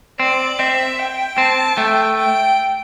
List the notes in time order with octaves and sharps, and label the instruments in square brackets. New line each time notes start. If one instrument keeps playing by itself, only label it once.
[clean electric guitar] C4 [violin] D5
[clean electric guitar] C4 [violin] E5
[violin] G5
[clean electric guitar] C4 [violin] A5
[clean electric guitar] A3 [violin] G5
[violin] G5